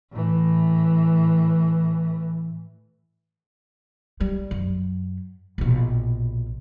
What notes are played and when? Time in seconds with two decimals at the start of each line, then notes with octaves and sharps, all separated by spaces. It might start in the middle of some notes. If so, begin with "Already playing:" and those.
0.12 A2 E3
4.20 G3
4.51 F#2
5.58 A#1 B2